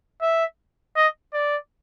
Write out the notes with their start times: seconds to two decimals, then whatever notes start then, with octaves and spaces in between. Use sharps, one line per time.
0.22 E5
0.96 D#5
1.34 D5